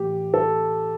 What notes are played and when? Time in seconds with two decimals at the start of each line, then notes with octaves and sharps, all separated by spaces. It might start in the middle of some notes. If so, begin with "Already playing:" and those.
Already playing: A2 E3 G4
0.34 A4